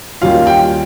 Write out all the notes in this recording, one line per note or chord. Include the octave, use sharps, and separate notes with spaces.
D#2 D#3 G3 C#4 F4 F5
G5